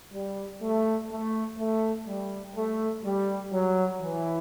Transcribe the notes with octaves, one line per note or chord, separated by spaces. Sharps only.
G3
A3
A3
A3
G3
A3
G3
F#3
E3